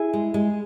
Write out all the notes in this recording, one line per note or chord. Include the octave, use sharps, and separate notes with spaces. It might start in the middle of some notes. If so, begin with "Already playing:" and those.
Already playing: E4 G#4
G#3
G#3